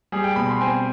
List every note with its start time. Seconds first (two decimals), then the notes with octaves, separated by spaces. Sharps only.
0.12 G3 G#4
0.24 G5
0.36 B2 B5
0.49 C6
0.61 C4 G#5